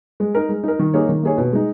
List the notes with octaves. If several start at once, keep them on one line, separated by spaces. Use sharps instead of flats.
G#3
D#4 A#4
G#3
D#4 A#4
D#3
A#3 D#4 G#4 C#5
D#3
A#3 D#4 G#4 C#5
B2
G#3 D#4